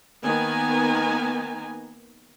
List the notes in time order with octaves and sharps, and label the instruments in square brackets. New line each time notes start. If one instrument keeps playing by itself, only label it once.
[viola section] D#3 A#3 B3 G#5 A#5